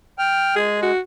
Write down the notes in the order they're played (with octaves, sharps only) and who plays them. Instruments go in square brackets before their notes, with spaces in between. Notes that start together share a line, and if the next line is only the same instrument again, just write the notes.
[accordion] G5 F6
[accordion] G#3 [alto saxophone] G#4
[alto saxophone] F#4